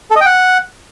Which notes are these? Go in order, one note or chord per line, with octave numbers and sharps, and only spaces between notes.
A4
D#5
G5
F#5